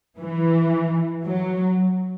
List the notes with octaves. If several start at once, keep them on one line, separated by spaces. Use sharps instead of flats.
E3
F#3